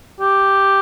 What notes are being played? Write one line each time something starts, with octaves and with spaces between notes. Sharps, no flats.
G4